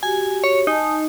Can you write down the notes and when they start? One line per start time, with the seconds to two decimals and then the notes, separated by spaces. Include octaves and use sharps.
0.03 F#4 G4 G#5
0.44 C#5
0.67 D#4 G#5 A5